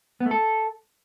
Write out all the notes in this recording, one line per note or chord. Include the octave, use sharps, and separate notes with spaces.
B3
A3
A4